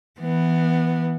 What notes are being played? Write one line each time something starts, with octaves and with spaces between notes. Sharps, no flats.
E3 B3